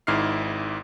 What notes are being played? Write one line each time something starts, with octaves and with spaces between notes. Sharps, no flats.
G#1 G#2 E4 F6 C7